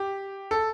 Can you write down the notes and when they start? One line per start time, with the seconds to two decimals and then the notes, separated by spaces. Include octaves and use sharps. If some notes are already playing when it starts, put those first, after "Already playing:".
Already playing: G4
0.51 A4